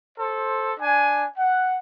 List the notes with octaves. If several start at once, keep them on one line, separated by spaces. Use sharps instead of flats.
A4 C5
D4 G#5
F#5